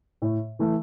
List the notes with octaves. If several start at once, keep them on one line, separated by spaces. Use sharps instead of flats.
A2
E3 A3